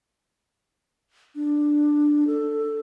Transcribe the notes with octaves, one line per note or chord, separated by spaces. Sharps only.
D4
A4